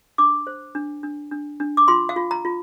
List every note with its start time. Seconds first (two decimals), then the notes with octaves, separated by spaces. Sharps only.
0.18 D4 D6
0.47 C5
0.75 D4
1.03 D4
1.32 D4
1.60 D4
1.77 D6
1.88 F4 C6
2.09 F5
2.16 F4
2.31 A#5
2.45 F4